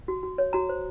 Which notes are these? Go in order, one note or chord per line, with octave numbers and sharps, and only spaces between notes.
F#4
F#4
C#5
F#4 A#5
C5